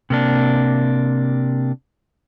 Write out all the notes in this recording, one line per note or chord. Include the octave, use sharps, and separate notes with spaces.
C3 A#3 D4